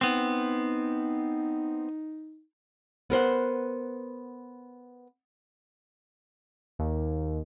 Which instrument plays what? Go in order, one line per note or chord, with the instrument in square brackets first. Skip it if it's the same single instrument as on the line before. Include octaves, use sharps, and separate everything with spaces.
[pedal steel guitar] B3 C4 [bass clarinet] D#4
[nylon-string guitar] B3 A#4 C5 F#5
[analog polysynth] D#2